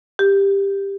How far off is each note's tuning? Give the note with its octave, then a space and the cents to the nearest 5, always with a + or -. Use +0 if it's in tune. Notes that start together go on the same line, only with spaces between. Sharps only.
G4 +15